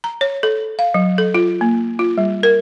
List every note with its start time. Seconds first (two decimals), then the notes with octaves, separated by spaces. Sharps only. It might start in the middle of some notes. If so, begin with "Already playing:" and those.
0.04 A#5
0.21 C#5
0.43 A4
0.79 F5
0.94 F#3
1.18 A4
1.34 F4
1.61 A#3
1.99 F4
2.18 G3
2.43 A#4